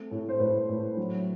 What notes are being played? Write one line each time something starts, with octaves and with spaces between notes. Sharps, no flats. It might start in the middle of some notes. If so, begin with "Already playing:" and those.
Already playing: A3 C4
A2
C5
A2 B4
A2
F#3